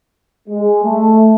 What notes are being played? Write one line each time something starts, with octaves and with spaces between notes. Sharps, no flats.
G#3
A3